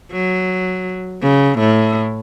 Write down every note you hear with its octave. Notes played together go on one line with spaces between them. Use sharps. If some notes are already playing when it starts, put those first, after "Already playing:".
F#3
C#3
A2